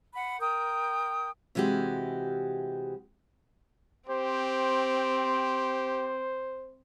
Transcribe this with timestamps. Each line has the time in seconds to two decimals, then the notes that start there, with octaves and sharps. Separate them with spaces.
0.14 F#5 B5
0.40 A#4 G5 D#6 G6
1.55 C3 E3 G#3 F#4 G4
4.09 C4 G4 C5